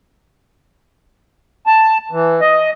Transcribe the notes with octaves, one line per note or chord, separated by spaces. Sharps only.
A5
E3
D#5